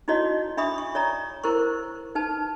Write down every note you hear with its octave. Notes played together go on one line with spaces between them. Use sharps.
D#4 E4 F#4 C#5 D#5
D4 E5 B5 C#6 D#6
C#6
C#5 D5 A#5
E4 A#4 C5 C#6
D#4 B4 A5